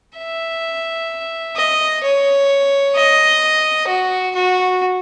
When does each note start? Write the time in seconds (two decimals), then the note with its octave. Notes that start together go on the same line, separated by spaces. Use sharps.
0.18 E5
1.56 D#5
2.04 C#5
2.96 D#5
3.88 F#4
4.35 F#4